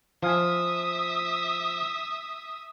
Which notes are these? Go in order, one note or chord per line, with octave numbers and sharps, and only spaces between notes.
F3 E5 F5 G#5 D#6